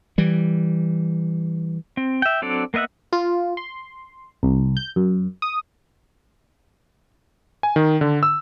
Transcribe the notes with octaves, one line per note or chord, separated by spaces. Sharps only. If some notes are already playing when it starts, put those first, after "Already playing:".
E3 G3
C4
E5 G5
F#3 C4 D4 A4 D5
A#3 B3 D#5 E5 F#5
F4
C6
C2
G6
F#2
D#6
G#5
D#3
D3
E6